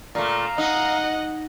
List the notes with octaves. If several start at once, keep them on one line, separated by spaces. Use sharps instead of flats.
A#2 A3 F5 A#5
D#4 D#5 F#5